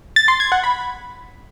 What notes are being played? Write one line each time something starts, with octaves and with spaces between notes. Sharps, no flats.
A6
C6
G#6
F#5
B5